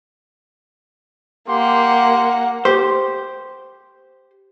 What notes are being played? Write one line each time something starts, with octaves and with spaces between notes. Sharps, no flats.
A#3 G4 F#5 C6
G4 C5